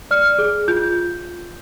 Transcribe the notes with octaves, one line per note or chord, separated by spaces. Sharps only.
D5 F6
G#4
F4 G6